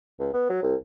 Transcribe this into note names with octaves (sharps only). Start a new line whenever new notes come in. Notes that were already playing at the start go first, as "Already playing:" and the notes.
C#2
B3
F#3
C2